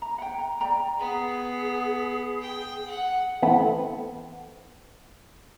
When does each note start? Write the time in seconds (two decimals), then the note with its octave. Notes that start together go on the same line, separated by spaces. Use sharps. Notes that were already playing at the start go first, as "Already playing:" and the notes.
0.02 A#5
0.18 F#5 G5
0.39 A#5
0.61 D5 G5 A#5
0.99 B3 G#4
2.41 G5
2.87 F#5
3.42 E3 A3 B3 C4